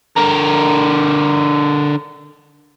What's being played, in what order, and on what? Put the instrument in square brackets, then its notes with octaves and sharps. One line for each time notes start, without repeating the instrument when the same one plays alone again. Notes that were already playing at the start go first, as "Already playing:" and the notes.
[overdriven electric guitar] D3 A#4